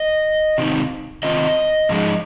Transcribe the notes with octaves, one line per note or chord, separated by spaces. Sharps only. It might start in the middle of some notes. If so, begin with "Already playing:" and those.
Already playing: D#5
C3 D#3 C4 D#4
C3 D#3 C4 F4 D#5
G#2 F3 G#3 D#4